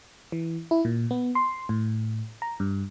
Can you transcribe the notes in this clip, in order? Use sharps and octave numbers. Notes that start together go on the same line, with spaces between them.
E3
E4
A#2
B3
C6
A2
A#5
G2